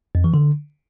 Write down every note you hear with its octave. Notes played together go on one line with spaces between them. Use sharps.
F2
E3
D3